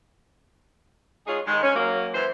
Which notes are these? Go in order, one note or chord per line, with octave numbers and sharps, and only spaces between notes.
G#3 C#4 D#4 F4 G#4
D#3 G#3
C#4
F#3 A#3
E3 C5